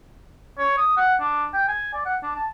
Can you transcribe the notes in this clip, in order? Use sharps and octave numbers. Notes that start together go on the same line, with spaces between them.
C#5
D#6
F#5
D4
G5
G#5
D5
F#5
D4
A5